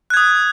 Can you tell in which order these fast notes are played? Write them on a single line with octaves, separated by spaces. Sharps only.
F#6 G#6 D#6